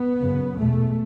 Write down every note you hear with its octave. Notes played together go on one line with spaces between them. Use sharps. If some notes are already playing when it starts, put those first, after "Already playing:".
Already playing: B3
F#2 C#3
E2 B2 A3